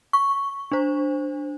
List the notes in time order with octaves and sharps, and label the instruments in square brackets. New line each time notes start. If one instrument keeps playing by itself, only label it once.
[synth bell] C#6
D4 C5